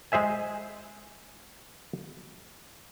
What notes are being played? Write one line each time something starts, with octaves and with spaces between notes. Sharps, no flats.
G#3 G#4 C5 E5 G#5